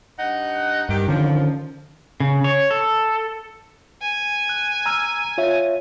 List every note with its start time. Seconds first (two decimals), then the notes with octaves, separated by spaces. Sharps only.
0.18 G2 D#4 F#5
0.89 G2 D#3 G4
1.08 D3 D#3 F3 C#4
2.20 C#3
2.44 C#5
2.71 A4
4.02 G#5
4.49 F#6
4.86 A#5 E6 F6
5.38 F4 C#5 E5